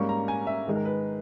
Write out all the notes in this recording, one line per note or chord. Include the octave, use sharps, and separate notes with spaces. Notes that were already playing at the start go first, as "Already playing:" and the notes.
Already playing: G#2 G3 A#3 C#4 C#6
A#5
G#5
E5
G#2 D#3 G#3
A#4
B4